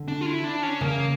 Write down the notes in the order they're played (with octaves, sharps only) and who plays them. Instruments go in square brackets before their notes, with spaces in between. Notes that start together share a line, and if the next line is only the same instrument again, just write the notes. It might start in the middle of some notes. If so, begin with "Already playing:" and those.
Already playing: [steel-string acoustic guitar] D3
[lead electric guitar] D4
F4
E4
D4
C#4
[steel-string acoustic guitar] C#3 [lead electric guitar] A#3